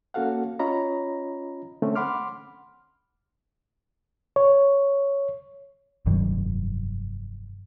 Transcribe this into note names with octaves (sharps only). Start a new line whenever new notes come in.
A#3 C#4 F#4 A4 F5 F#5
C#4 F4 C#5 D#5 A#5 B5
D3 A3 C4 C#4
F#5 B5 C6 D6 F6
C#5
F1 G2 D#3 F#3